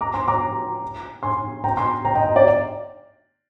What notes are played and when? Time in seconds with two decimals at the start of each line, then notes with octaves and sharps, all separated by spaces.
0.01 A#5 D6
0.14 G#5 C6
0.28 A#5 D6
1.23 G#5 C6
1.64 G5 A#5
1.77 G#5 C6
2.05 G5 A#5
2.15 D#5 G5
2.25 D#5
2.36 D5